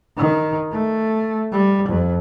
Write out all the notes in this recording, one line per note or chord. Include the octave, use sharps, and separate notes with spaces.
D#3
A3
G3
F2